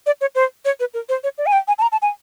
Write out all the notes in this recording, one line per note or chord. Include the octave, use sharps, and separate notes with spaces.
D5
C#5
C5
C#5
B4
A#4
C5
C#5
D5
G#5
G5
G#5
A5
A#5
A5
G#5